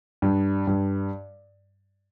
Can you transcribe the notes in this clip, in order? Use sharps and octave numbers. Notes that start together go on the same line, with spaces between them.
G2
G2